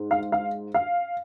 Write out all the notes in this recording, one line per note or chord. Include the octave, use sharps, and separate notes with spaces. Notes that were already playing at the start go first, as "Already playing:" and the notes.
Already playing: G#2
F5
F5
F5